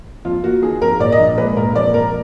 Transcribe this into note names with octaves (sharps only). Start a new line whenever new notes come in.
F2 F4
A#3 F#4
D#3 G#4
F2 A#4
A#2 D5
D#5
A#1
G#3 B4
A#2 A#4
F2 D5
F2 A#4